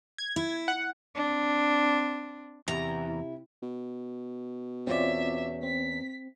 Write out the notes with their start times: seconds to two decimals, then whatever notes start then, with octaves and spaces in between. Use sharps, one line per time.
0.18 G#6
0.36 E4
0.68 F#5
1.16 C4 D4
2.68 E2 C3 E4 A#5
3.62 B2
4.87 E2 C4 C#4 F4 D5 E5
5.63 C4 B6